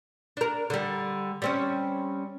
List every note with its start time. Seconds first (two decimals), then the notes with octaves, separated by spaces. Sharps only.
0.37 D4 A#4
0.70 D3 G3
1.42 G3 C4 C#4